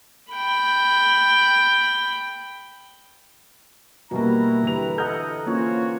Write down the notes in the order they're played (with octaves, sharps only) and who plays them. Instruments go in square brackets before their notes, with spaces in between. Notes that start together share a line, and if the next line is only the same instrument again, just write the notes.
[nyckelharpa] G5 B5
[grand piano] B2 G3 A#3 [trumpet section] E4 A#5 [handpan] F#4
[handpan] D3 E3 B4 [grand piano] G4 F7
[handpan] A4 F#5 [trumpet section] D#5 [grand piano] A#5 F6 G6
[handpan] A#3 C#4 F4 [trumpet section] F#4 C5 C#5